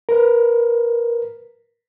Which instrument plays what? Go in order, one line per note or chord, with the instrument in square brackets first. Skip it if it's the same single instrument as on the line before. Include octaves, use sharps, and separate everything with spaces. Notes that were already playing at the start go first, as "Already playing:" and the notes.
[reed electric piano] A#4 B4